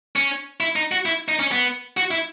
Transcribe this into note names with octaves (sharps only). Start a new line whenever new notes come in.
C#4
E4
D#4
F#4
E4
D#4
C#4
B3
F#4
E4